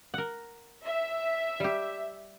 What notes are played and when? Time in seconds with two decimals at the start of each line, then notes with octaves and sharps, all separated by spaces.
0.14 A#4 F#5
0.86 E5
1.60 G3 G4